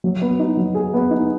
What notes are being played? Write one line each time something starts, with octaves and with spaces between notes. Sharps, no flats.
F#3
B3
D#4
F#3
G#4
B3
D#4